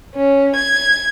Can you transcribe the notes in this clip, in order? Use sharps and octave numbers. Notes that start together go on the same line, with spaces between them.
C#4
G#6